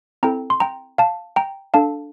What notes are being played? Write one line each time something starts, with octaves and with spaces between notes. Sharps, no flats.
C4 E4 A4 G5 A#5
C6
G5 A#5
F5 A5
G5 A#5
D4 A4 F5 A5